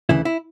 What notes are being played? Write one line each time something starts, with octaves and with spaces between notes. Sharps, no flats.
D2 C#3 E3 E4
E4